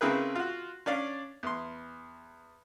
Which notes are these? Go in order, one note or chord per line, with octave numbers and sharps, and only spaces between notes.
C#3 C4 E4 G#4 A#4 B4
F4 F#4
C#4 D4 D5 F5
E2 C6